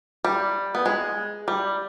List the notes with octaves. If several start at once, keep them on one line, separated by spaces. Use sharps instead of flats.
G3
B3
G#3
G3